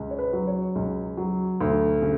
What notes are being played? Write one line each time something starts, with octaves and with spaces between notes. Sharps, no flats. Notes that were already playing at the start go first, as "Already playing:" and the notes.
Already playing: C#2
C#5
B4
F#3
C#5
C#2
F#3
D2
C#3